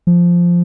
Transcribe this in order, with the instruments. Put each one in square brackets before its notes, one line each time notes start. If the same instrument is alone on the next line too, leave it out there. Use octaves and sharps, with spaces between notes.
[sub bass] F3